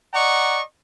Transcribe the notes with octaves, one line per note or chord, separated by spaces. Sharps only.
D5 D#5 F#5 A#5 C#6